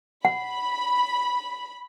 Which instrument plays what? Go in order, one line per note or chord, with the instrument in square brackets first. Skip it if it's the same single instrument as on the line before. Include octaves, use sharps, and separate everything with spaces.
[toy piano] F#5 [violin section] B5